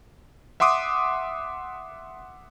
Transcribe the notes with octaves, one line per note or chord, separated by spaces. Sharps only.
E5 F#5 C6 D6 D#6